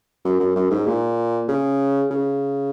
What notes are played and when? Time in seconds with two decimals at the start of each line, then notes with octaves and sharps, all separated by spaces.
0.25 F#2
0.40 F#2
0.56 F#2
0.71 G#2
0.87 A#2
1.49 C#3
2.11 C#3